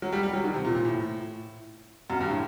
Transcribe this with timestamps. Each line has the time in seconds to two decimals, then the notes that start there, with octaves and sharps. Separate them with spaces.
0.02 F#3
0.13 G3
0.23 G3
0.33 F#3
0.44 D#3
0.54 C3
0.65 A#2
0.75 A#2
0.85 A2
2.10 F#2
2.21 G2
2.30 A2